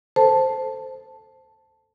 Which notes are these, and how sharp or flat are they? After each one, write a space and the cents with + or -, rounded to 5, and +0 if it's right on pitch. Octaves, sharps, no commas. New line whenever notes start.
A4 +0 C5 +0 A5 +0